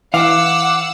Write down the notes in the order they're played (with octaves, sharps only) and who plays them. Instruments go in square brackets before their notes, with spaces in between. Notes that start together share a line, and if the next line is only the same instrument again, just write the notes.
[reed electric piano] E3 [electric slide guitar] F5 [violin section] F#5 E6 [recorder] D6